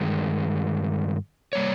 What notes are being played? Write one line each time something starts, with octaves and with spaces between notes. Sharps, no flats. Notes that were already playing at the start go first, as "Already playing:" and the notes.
Already playing: G2 D#3 G#3
G3 A#3 C#5